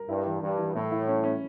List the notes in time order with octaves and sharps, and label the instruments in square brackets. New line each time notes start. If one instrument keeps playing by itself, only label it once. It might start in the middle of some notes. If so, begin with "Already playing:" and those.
Already playing: [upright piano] A#4
[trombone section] G2 [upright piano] E4
[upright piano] E3
[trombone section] G2 [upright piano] E3
[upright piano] E3
[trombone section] A2 [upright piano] A3
[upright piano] E4
C#4
C#4